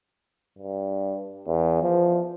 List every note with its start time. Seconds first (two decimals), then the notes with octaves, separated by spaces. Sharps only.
0.58 G2
1.47 E2
1.83 F3